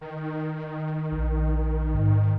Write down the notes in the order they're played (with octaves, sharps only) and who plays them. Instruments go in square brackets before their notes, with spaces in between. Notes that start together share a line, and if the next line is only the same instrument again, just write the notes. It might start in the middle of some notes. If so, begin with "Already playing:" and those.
[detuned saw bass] D#3
[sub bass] A#1
G#2